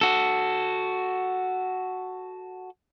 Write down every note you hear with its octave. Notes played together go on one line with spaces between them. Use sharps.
F#4 A4